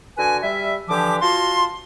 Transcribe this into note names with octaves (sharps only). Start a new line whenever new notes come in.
D3 F#4 B4 G#5
G3 E5
D3 E3 F3 G4 D6
F4 F#4 A5 C6